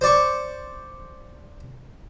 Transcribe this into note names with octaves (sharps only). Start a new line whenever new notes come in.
C5 D5 C#6